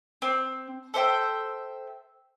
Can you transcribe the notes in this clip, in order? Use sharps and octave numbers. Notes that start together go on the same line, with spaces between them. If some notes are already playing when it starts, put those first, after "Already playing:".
C4
A4 C5 E5 G5